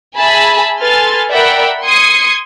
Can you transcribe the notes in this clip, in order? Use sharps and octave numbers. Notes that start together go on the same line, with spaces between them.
G#4 E5 G#5 A5 B5
A4 B4 G#5 C6 F6 A6
A#4 D5 E5 F#5 G5 B5
C6 D#6 G#6 C7 C#7